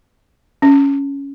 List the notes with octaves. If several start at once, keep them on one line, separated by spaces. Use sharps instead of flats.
C#4